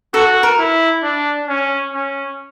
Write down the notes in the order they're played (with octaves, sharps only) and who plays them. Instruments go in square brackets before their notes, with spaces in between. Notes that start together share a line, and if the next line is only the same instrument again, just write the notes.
[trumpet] F#4 [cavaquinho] A4
[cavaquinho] A#4
[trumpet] E4
D4
C#4
C#4